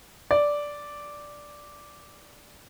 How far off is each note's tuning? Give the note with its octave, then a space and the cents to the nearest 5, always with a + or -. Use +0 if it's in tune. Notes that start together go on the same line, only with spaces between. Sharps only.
D5 -5